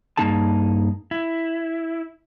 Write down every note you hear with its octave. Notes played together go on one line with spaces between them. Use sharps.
G2 F3 A#3 D#4 G#4 A5
E4